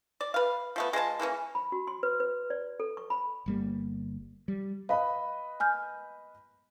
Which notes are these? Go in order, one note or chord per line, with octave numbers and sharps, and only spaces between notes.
D5
B4 F5
F3 A3 B3
G#3 F4 C5 A5
E3 A#3 B3 C#4
B5
F#4
C6
B4
B4
D5
A4
C#6
B5
G1 G3 A#3
G3
B4 D#5 F5 B5
G#5 F6 G6